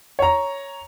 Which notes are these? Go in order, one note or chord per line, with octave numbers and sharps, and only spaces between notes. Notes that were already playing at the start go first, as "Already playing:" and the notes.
C#5 A#5